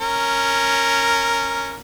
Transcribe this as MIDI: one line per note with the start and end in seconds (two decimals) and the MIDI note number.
0.01 1.78 61
0.01 1.78 70